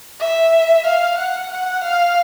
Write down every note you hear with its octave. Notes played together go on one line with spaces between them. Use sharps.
E5
F5
F#5
F#5
F5